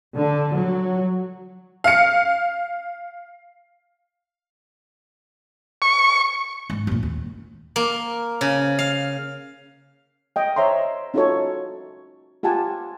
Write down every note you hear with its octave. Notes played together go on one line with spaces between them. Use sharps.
D3
F#3
F5 C#7
C#6
G#2
F#2 A#2
D#2
A#3
C#3
F5
D#5 G5
C5 C#5 E5 A#5 C6
C#4 D#4 F4 F#4 A4 C#5
F4 G4 F#5 G#5 A5